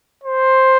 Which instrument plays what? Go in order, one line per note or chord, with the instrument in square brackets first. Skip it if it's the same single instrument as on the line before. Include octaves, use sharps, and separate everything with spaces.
[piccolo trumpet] C5